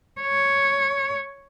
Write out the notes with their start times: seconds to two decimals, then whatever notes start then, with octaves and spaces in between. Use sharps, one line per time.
0.21 C#5